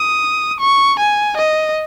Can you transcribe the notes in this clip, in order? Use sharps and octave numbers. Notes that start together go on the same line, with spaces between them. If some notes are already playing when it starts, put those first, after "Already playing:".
Already playing: D#6
C#6
G#5
D#5